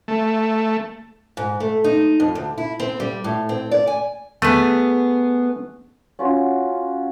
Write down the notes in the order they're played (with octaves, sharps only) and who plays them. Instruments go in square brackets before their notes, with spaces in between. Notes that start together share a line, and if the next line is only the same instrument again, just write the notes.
[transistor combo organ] A3
[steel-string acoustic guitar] G#2
A3
D#4
F2
D2
E4
C4
G3
A2
C4
D5
G#5
[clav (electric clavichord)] A3 B4 [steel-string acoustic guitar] B3 G#4
[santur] C#4 F4 F#4